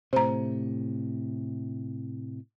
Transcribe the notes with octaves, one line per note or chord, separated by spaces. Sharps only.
A2 C3 C5 A#5